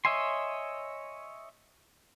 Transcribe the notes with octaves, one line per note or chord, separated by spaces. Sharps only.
C#5 D#5 E5 G#5 C6